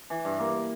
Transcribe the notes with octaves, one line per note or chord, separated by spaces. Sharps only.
E3
G2
A#3